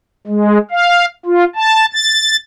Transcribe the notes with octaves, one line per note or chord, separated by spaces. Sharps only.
G#3
F5
F4
A5
A6